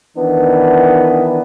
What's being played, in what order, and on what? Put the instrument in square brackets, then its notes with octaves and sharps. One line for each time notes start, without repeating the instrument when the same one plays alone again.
[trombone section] D#3 E3 B3 D4